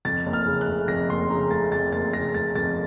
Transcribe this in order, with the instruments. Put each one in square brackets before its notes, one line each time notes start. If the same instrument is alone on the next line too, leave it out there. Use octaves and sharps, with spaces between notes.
[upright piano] F2 A6
F#1
F6
C#3
F#6
A3
F2 A#6
F#1 C6
C#3 A#5
A3 A6
F2 A6
F#1 A6
C#3 A#6
A3 A6
F2 A6